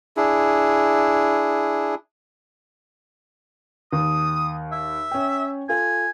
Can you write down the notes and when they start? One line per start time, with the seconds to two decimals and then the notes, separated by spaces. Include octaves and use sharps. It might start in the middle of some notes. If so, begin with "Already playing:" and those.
0.17 D4 E4 G#4
3.93 D#2 D#6
4.72 E5
5.11 C#4 G5
5.69 F4 A4 G#5